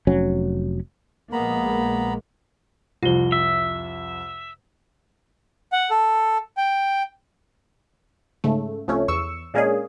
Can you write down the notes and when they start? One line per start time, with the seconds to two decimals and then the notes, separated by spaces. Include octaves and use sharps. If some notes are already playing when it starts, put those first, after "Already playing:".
0.07 F1 F#3 C#4
1.32 A#1 G#3 A#3 B3 A#5 B5
3.03 C2 F2 F4 G7
3.32 E5
5.72 F#5
5.90 A4
6.57 G5
8.44 G#2 C#3 A3
8.88 C2 F3 A3 C#4 C#5
9.08 E2 C#6 E6
9.54 A#2 G#3 A#3 C#4 D4 G#4